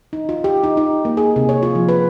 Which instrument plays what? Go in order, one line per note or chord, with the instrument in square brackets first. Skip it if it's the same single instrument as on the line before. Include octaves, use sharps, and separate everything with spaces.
[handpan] D#4
F4
G4
D#4
D#4
A#3
G#4
C3
C#5
F4
F3
B4